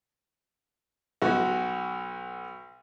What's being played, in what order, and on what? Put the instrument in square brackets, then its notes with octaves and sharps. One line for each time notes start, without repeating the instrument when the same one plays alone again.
[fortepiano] B1 F#4